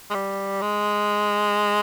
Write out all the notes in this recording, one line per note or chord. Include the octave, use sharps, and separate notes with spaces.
G#3
G3
G#3